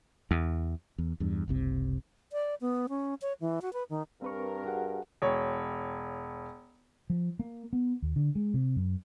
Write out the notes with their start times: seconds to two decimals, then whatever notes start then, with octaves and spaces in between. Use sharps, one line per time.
0.31 E2
0.98 E2
1.20 E2 G2
1.48 F#1 C2 C3
2.32 D5
2.61 B3
2.89 C#4
3.22 C#5
3.41 E3
3.62 F#4
3.73 B4
3.90 D#3
4.22 G2 C4 A#4 B4 C#6
4.66 F#4 G#4 F#5
5.22 E1 C#5
7.10 F3
7.39 A#3
7.73 B3
8.02 D#2
8.16 D3
8.35 G#3
8.54 C3
8.76 F#2